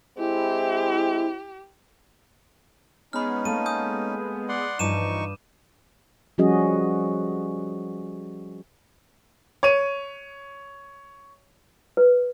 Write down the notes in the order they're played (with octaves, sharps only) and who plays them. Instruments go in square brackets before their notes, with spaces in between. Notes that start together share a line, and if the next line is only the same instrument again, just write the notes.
[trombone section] G#3 C4 [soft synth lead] E4 [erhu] G4
[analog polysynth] G#3 B3 G#4 [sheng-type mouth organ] C#4 D#4 [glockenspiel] B5 F6
[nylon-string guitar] A3 A#3 [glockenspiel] D#7
[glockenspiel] D#6 G6
[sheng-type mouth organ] D5 F#5 C6
[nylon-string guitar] G2 [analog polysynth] E3 F3 [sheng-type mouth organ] D#4 C#6 [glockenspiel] D6 D#7 E7
[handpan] F3 G3 C#4 F#4 G#4 D#5
[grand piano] C#5 D#7
[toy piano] B4